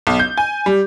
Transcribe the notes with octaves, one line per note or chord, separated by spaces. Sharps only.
B1
G6
G#5
G3